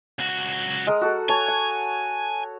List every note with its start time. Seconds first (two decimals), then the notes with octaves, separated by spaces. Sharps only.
0.19 C#2 F#4
0.87 G#3 A#4 D#6
1.01 F#4 A4
1.29 C#5 G#5 A5
1.48 F#5